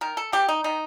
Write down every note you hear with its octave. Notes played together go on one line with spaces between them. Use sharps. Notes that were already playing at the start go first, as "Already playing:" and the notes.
D#3 A#4
A4
A3 C4 G4
D#4
D#3 D#4